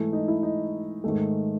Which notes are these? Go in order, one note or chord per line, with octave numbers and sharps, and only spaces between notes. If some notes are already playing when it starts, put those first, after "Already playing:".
Already playing: G#2 E3 A3
D#4
E4
D#4
G#2 D#3 A3